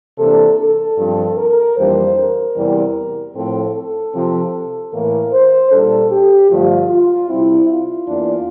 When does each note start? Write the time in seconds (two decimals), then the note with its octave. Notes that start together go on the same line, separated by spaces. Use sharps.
0.18 C3 E3 A#3 D4 A4
0.59 A4
0.97 G2 F3 C4
1.38 A#4
1.77 F2 E3 G3 A#3 D4 C5
2.17 A#4
2.56 E2 C3 E3 G3 C4
3.34 A2 F3 C4 A4
3.75 A4
4.13 C3 F3 C4
4.92 A2 E3 A#3 A#4
5.32 C5
5.71 A#2 G3 D4 A4
6.10 G4
6.50 G2 D3 F3 A3 F4
6.89 F4
7.29 C3 G3 C4 E4
7.69 F4
8.07 E2 E3 A#3 D4